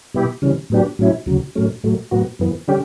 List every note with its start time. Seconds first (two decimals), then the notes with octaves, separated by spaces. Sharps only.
0.14 B2 G3 B3 E4 G4
0.42 C#3 E3 G3 C#4
0.70 A2 F#3 B3 D4 G4
0.99 A2 F#3 C#4 E4
1.26 D2 C#3 F#3
1.55 A2 F#3 A3 C#4
1.83 A2 F#3 A3
2.11 A2 F#3 B3 F#4
2.39 F#2 E3 B3
2.68 D3 G3 C#4 G4